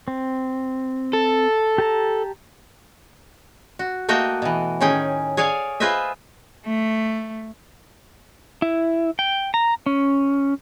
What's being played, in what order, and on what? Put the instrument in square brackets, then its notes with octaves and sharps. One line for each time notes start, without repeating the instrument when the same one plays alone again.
[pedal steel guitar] C4
[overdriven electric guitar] A4
[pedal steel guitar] G4 A5 A#5
[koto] F#4
A3 A#3 F#4 D#5 G5
B2 E3
A2 D#3 C#4 G#4 G5
G#4 C#5 D5 F5 G#5
F4 G#4 B4 C5 D#5 E5
[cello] A3
[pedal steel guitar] E4
G5
A#5
C#4